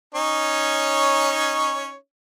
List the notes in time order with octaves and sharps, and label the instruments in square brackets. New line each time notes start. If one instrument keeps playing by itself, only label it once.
[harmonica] C#4 D#4 C#5